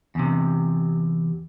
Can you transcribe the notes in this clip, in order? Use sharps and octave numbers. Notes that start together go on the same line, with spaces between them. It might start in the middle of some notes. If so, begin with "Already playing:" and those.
E2 C3